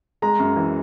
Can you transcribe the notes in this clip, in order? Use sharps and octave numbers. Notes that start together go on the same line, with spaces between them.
G#3 A#5
F#2
E3